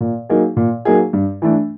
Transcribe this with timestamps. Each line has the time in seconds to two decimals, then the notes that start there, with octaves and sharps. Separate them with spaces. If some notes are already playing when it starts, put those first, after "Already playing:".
0.01 A#2
0.29 F#3 A#3 D#4 G#4
0.57 A#2
0.85 F#3 A#3 D#4 G#4
1.13 G2
1.42 E3 A3 D4